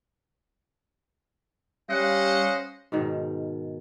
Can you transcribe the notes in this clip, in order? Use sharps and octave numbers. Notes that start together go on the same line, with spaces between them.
G3 C#4 C5 D#5 F5 F#5
G#2 B2 D#3